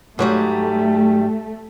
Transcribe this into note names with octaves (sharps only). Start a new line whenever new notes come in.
G#2 F#3 G3 A3